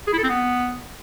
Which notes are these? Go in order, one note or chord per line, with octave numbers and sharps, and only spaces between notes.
G#4
E4
A4
C4
B3